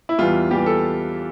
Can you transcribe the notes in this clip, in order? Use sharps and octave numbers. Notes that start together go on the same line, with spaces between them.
E4
E2 E3 G3 F4
E2 E3 G3 G4
A4